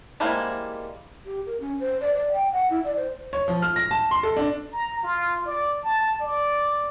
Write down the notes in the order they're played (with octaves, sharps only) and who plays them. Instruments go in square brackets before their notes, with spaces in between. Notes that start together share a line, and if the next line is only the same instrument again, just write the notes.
[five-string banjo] G3 G#3 A#3 E4 C5
[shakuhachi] G4
A#4
C#4
C5
D5
D5
G5
F#5
E4
D5
C5
[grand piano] C#5
F3
F6
A#6
A5
C6
A4
D4
[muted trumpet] A#5
F4
D5
A5
D5